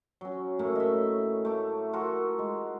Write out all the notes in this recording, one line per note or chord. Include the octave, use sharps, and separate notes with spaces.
F#3 C#4
A2 A3 A#3
D#5 E5
A3 D6
F4 F#4 A4 A#4
G#3